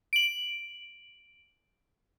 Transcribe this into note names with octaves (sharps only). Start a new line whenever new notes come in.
D7 F#7